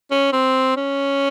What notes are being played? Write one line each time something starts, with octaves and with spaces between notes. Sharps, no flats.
C#4
C4
C#4